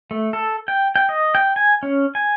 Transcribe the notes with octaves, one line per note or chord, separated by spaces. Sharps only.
A3
A4
G5
G5
D#5
G5
G#5
C#4
G#5